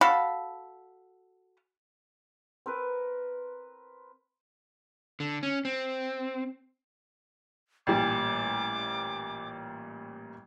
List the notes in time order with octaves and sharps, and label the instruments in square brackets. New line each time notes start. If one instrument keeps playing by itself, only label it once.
[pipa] F#4 A4 F5 B5
[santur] C4 A#4 B4
[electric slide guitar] D3
C#4
C4
[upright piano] A1 A#2 G3 [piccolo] D6